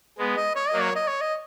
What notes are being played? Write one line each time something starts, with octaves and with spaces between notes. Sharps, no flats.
G#3 B3
D#5
C#5
F#3 A#3 D#5
C#5
D#5
C#5
D#5